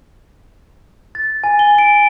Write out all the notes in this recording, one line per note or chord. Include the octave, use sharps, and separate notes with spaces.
A6
G#5
G7
D7